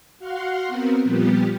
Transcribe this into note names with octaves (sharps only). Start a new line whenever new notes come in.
F#4 F5 F#5 C6
B3 C4 A#4
A#2 F3 G3 B3 G4